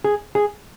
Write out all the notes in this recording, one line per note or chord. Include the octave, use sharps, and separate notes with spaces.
G#4
G#4